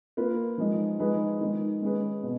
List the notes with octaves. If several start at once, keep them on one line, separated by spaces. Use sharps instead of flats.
A#3 F4 B4
F3 G#3 D#4
F3 G#3 D#4 G#4 B4
D#3 G#3 D#4
G#3 C#4 G#4 B4
B2